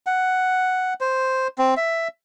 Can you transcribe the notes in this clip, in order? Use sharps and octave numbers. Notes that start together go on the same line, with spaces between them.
F#5
C5
C4
E5